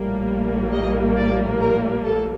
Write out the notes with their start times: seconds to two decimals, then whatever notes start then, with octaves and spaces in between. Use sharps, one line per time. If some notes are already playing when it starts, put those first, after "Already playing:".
Already playing: A#1 A2 G3 A#3
0.72 D#5
1.16 D5
1.60 A#4
2.04 A4